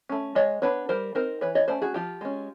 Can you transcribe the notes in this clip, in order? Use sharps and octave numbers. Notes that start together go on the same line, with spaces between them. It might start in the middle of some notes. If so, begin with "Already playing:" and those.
A3 C#4
G#3 C#5 D#5
B3 D4 B4 C#5
G3 A#4 C5
C4 D#4 A#4 C5
E3 B4 C#5
C#5 D#5
A3 C#4 C5 D5
F#4 G#4
F3 F4 G4
G#3 C#4